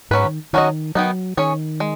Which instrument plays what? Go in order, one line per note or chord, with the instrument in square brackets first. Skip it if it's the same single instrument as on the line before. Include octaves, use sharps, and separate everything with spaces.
[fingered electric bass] G#2 [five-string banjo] F#3 C#4 B4
[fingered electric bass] D#3
[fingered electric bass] D#3 [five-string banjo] F#3 C#4 F#4 D#5
[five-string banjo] D#3 B3 D#4 [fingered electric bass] F#3
[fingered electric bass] D#3 [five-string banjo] C#4 G#4 C#5
[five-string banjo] G#3